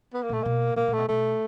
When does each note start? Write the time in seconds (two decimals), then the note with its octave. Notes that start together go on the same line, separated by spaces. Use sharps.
0.13 B3
0.23 A#3
0.29 A#2 A3
0.43 B2 A#3
0.76 A#2 A#3
0.88 A#2
0.93 B2 A3
1.08 B2 A3